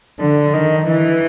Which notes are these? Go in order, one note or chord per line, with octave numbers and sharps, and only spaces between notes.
D3
D#3
E3